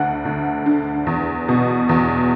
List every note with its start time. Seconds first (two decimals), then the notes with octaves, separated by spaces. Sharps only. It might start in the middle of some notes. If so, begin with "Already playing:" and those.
Already playing: D2 D3 F#5
0.25 D2
0.66 D3
1.06 E2
1.49 B2
1.89 E2